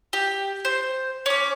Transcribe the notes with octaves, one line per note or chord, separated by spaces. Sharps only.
G4
C5
C#4 D6